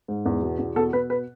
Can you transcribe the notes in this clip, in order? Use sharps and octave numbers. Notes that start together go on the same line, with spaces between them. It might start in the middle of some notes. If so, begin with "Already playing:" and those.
G#2
E2
B2
E2
B2 A4
B2 B4
B4